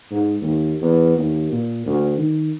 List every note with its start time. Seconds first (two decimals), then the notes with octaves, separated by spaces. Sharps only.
0.11 G#2
0.41 D#2
0.81 E2
1.17 D#2
1.52 A#2
1.86 D2
2.17 D#3